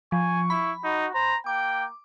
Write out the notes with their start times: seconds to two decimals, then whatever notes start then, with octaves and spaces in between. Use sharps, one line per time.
0.12 F3 G#5 C#6
0.50 E4 B5
0.84 D#4 F#4
1.14 C5 A#5
1.46 A#3 G5 D6